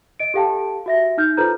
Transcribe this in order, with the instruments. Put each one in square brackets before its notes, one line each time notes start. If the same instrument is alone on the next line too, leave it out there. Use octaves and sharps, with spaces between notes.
[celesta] D#5 D7
G4 A4 F5 G5 A5
F#4 E5 A#6
D#4 F6 G6
F4 A4 B4 C5 A#5 G6